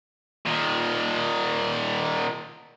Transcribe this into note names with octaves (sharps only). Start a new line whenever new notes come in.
A#2 D#3